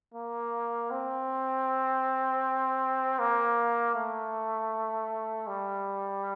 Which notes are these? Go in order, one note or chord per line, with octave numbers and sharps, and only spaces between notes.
A#3
C4
A#3
A3
G3